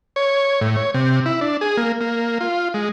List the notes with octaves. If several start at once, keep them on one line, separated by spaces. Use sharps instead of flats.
C#5
A2
C#5
C3
E4
D4
G#4
A#3
A#3
F4
G#3